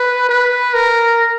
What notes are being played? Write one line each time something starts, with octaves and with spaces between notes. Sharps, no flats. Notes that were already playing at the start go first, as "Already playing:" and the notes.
Already playing: B4
B4
A#4